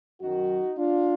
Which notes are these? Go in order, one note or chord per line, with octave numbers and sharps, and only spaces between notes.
F#2 D#3 F#3 D#4 F#4
D4 F4